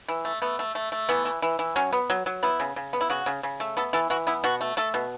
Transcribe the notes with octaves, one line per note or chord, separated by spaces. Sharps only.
E3
A3
A3 B3
A3
A3
A3
E3 B3
E3
E3
E3
F#3 C#4
B3
F#3
F#3
B3 E4
C#3
C#3
B3
E4
C#3 F#4
C#3
C#3
A3
B3 A4
E3 A4
E3 F#4
B3 E4
B2 F#4
A3
A3 A4
B2